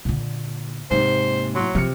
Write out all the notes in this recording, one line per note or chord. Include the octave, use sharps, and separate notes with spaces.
A#2 D3
G#2 C3 A#3 C5
A2 F#3 C6
C3 F3 F6 C#7